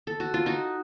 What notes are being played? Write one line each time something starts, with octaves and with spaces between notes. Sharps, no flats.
A4
F#4
F4
D#4 F#4